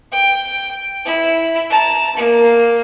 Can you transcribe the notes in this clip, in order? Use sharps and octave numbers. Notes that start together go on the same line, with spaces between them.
G5
E4
A5 A#5
A#3